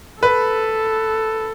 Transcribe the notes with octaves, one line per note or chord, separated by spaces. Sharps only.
A4 B4